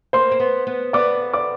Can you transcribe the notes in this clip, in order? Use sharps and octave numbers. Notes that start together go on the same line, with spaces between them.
A#3 C5 C6
C4
B3
B3
B3 D5 D6
D5 D6